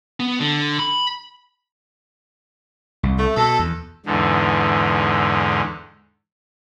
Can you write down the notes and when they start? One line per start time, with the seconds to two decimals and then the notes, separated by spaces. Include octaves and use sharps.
0.20 B3
0.41 D3
0.79 B5
3.03 C2
3.19 A3
3.37 B2 A4
3.59 E2
4.06 E2 G#2 D3